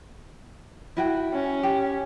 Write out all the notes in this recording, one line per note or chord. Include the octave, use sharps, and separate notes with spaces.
E4 F#4 G5
C#4
G4